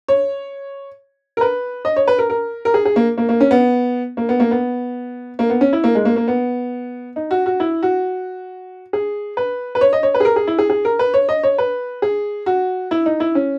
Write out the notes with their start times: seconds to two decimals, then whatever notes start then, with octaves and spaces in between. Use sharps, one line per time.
0.08 C#5
1.37 A#4
1.41 B4
1.85 D#5
1.96 C#5
2.08 B4
2.19 A#4
2.30 A#4
2.65 A#4
2.74 G#4
2.85 G#4
2.96 A#3
3.18 A#3
3.29 A#3
3.41 C#4
3.51 B3
4.17 A#3
4.29 B3
4.40 A#3
4.51 B3
5.39 A#3
5.50 B3
5.61 C#4
5.73 E4
5.84 A#3
5.95 G#3
6.05 A#3
6.16 A#3
6.28 B3
7.16 D#4
7.31 F#4
7.46 F#4
7.60 E4
7.83 F#4
8.93 G#4
9.37 B4
9.75 B4
9.81 C#5
9.93 D#5
10.03 C#5
10.14 B4
10.20 G#4
10.25 A#4
10.36 G#4
10.47 E4
10.58 G#4
10.70 G#4
10.85 A#4
10.99 B4
11.14 C#5
11.29 D#5
11.43 C#5
11.58 B4
12.02 G#4
12.46 F#4
12.91 E4
13.06 D#4
13.20 E4
13.35 C#4